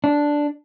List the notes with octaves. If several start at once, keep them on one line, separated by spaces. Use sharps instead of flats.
D4